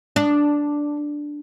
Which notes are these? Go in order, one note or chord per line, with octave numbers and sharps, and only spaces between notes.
D4